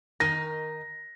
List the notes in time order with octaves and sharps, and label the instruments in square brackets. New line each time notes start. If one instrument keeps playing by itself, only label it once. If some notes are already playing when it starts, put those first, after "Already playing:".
[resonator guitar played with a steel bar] D#3 D#4 A#4 [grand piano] A#6